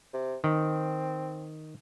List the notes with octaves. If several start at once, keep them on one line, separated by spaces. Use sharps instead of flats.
C3
D#3 C4